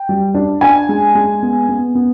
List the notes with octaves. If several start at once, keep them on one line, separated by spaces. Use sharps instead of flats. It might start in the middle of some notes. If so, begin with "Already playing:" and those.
Already playing: G5
G3
D4
D4 G#5
G#3
G#3
B3
B3
B3